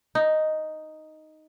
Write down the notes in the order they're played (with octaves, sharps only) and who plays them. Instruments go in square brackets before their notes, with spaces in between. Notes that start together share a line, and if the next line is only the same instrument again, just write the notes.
[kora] D#4